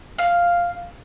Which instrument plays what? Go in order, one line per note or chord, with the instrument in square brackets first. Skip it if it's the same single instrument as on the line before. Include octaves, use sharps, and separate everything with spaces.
[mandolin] F5